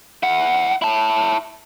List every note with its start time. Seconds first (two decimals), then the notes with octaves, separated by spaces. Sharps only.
0.23 E4 F#5
0.82 E4 A5